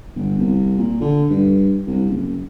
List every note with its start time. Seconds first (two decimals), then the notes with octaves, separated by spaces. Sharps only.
0.16 G1
0.39 C2
0.78 A#2
1.01 D3
1.30 G2
1.86 C2
2.10 F#1